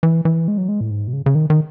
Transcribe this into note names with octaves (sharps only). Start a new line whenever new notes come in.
E3
E3
G#3
F#3
G#3
A2
G#2
B2
C#3
C#3
D#3
D#3